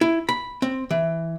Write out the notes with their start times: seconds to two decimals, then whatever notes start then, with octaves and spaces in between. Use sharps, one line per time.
0.01 E4
0.29 B5
0.62 C4
0.91 E3